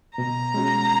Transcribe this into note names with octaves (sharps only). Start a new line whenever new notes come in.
B2 A#5
G#3 C#4 F#4